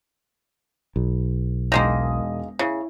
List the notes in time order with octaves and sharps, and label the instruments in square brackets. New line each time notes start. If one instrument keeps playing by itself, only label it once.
[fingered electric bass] B1
[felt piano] E1 D#6 A#6 [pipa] D#3 G#3 A#3
[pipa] C#3 [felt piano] E4